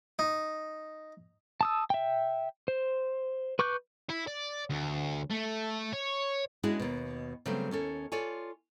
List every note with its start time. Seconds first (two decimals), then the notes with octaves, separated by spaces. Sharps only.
0.19 D#4
1.61 A5 D#6 E6
1.90 E5 G5
2.68 C5
3.59 B4 C#6 D6 F#6 G6
4.10 E4
4.28 D5
4.70 D2
5.30 A3
5.93 C#5
6.63 G#3 C#4 D4 E4 F#4 G#4
6.80 D#2 B2
7.46 C#3 F#3 G3 A3 B3 C4
7.71 D#2 C#4 A4
8.12 F4 A4 C#5 D5 G#5